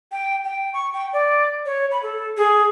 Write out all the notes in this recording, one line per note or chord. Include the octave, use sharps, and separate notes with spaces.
G5
G5
C#6
G5
D5
C#5
B5
A4
G#4